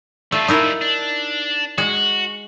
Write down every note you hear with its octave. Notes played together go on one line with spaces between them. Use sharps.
G3 A3 F4
D#4 E4 A#4
D4
G#3 F#4